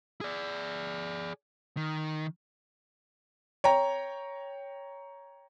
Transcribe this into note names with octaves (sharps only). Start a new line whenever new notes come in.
G#4 D5
D#3
C#5 G5 A#5